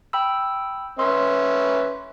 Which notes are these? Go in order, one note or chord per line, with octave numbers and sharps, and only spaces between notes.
G5 B5 E6
C#4 B4 E5 C6